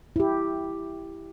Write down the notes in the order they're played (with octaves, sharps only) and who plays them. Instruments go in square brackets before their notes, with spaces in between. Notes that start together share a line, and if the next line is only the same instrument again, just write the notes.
[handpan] E4 G4